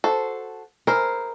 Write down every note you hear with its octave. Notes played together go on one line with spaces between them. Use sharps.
F#4 A4 C5
E4 G#4 A#4 C5